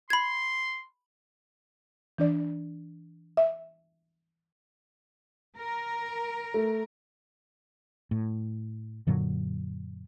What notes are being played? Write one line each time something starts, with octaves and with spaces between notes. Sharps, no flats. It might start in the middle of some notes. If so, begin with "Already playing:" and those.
B5 C6 G#6
E3 D4 D5
E5
A#4
A3
A2
F#2 A#2 D3 F#3